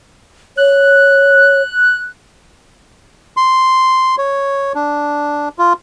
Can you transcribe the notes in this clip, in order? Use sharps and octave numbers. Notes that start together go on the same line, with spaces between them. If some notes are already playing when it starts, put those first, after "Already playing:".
C#5 F#6
C6
C#5
D4
F4